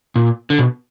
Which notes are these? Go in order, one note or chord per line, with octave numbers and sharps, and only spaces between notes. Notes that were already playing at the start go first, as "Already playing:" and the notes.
A#2
D3
B2